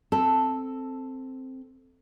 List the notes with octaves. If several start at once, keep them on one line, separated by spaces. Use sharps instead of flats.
C4 A4